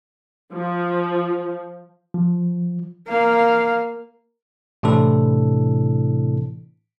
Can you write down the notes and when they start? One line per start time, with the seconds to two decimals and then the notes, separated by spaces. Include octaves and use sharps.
0.54 F3
2.14 F3
3.09 A#3 F5
4.83 A2 C3 E3 C4 D4 A4